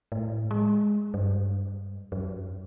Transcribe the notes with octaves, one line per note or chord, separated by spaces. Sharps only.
A2
G#3
G2
F#2